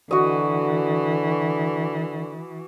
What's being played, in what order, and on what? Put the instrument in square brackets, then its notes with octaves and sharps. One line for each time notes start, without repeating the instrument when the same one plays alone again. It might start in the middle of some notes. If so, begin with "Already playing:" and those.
[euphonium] D3 [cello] E3 [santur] F#4 D#5